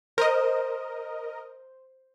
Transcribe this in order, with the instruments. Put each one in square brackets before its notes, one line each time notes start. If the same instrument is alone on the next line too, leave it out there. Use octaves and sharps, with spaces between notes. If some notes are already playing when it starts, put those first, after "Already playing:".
[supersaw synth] A#4 D#5 [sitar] C5